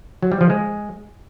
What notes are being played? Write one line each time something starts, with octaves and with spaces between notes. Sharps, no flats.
F#3
G3
F3
G#3